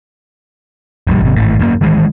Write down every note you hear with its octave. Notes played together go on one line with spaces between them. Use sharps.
F1 A#1 G3
G#1 C3
G#1 A2
G#1 F#2 A2 A#3
D#3 E3 G#3